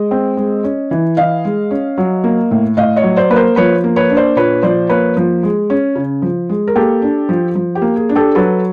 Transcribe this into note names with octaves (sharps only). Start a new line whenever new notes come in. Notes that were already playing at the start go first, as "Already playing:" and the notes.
Already playing: G#3 D#5
C4
G#3
C#4
E3
E3 D#5 F5
G#3
C#4
F#3
A#3
A2
A2 D#5 F5
C#5 D#5
F#3
C5 D5
A#3 B4
A#4 C5
F3 B4 C#5
A#3
B4 C#5
D4
C5 D5
A#2 B4 C#5
F3 C5 D5
A#3 B4 C#5
F3
G#3
C#4
C#3
F3
G#3
A#4
A#3 G4 A4
D4
F3
F3
G4
A#3
G#4
D4
G4 A4
F#3 A4 B4